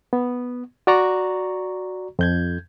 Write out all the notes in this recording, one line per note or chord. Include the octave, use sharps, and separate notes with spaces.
B3
F#4 D5 A#5 C#6
F2 G6 G#6